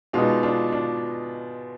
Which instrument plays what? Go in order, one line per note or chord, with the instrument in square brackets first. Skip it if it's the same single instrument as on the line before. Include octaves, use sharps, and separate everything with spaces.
[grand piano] B2 G#3 B3 D#4 [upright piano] D4 F4
[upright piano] D4 F4
D4 F4